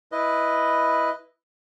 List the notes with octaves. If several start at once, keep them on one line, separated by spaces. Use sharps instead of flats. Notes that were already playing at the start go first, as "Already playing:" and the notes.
E4 B4 D#5